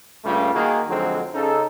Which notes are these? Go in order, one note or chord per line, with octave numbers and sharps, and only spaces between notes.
G2 C#3 G3 A3 A#3 F4
D#3 A#3 F#4 G#4
F2 D3 F3 F#3 G#3 C4
C#3 D#4 A4